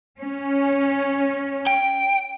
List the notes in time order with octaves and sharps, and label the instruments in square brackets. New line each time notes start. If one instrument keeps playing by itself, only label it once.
[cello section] C#4
[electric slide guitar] G5